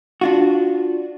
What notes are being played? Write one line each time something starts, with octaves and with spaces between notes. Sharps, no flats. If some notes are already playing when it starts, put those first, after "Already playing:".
D4 F4 F#4